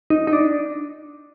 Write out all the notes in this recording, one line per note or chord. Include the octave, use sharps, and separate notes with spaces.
D#4
D#4
D4